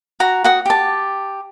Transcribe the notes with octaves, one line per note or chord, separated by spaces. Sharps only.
F#4 A#5
F#4 F#5 D#6
G4 A5